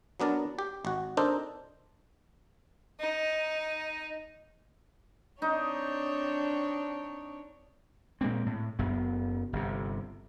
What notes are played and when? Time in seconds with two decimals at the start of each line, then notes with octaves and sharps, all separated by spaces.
0.20 F#3 B3 D4 A#4 A5
0.59 G4
0.85 G#1 F#4
1.17 C4 D4 D#4 A4 A#4 C5
3.00 D#4
5.42 C4 D4 D#4 C#5
8.21 A#2 G#3 A#3 C4
8.46 A2
8.79 F#1 F#2 B3
9.53 G1 C3